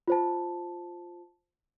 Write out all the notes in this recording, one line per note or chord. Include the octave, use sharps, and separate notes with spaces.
F4 C5 A5